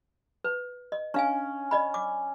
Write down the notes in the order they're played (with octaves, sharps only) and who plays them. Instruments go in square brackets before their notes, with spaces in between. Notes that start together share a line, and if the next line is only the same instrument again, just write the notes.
[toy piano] B4
D#5
[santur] C#4 [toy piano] D4 F5 G#5
[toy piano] D5 D#5 B5
D6